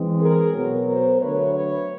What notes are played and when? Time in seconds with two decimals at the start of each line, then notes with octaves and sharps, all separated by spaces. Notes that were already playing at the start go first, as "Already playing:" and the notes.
Already playing: E3 G#3 C4
0.21 G#4 A#4
0.54 B2 F#3 B3
0.88 A#4 C5
1.21 D3 F#3 A3 B4 C#5
1.54 B4 C#5